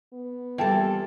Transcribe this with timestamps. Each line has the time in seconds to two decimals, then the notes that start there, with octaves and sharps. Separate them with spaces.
0.13 B3
0.58 E3 G3 A#3 E4 F4 A4 G5 A5